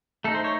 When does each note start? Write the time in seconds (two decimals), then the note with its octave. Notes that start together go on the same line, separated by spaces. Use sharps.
0.24 A3 A4
0.28 D#4
0.35 C5
0.44 C#5